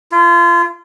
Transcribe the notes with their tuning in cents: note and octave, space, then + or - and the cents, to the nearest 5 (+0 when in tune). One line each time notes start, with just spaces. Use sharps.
F4 -30